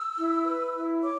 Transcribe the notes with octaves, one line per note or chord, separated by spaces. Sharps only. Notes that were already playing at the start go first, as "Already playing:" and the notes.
Already playing: E6
E4
B4
E4
C#5 D6